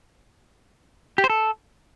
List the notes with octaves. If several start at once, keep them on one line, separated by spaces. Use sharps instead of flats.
G4
C5
A4